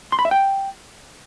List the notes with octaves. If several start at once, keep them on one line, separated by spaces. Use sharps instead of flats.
C6
B5
E5
G5